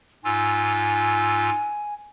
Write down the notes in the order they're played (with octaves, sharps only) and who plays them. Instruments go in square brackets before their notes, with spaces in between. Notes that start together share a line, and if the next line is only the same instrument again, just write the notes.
[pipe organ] G#2 F4 E6 [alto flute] G#5